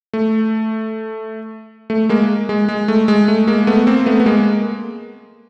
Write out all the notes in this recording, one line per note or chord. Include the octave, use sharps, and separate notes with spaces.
A3
A3
G#3 A#3
G#3
G#3
A3
G#3
A3
G#3 A#3
A3 B3
A#3 C4
A3 B3
B3
G#3 A#3